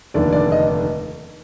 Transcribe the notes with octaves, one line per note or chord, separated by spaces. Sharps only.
F1 D#2 D3 D5
D5
D#5